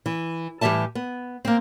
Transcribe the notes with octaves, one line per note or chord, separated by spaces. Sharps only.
E3
A2 E3 G3 G4 E5 A5
B3
A#3 C4